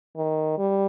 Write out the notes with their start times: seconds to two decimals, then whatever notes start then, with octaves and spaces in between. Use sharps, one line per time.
0.16 D#3
0.58 G3